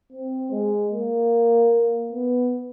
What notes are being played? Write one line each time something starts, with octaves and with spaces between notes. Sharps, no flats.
C4
G#3
A#3
B3